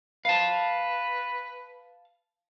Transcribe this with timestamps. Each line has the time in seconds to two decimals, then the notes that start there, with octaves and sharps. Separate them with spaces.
0.25 B4 F5 A5